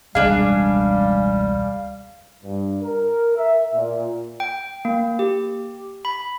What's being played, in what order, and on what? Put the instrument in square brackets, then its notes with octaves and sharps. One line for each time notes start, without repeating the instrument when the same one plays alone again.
[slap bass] E1 C#2 [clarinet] G3 [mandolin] D4 G#4 [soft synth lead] F5
[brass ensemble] G2
A#4
E5
A#2
[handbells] G5
A#3
G4
B5